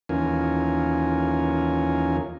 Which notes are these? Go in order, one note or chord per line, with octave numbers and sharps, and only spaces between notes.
D#2 E3 C#4 F4 A#4 G#5